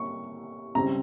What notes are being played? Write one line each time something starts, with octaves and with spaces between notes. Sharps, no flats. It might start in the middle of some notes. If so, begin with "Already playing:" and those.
Already playing: C3 G3 A#3 C#4 C#6
C#2 C#3 G3 C4 A#5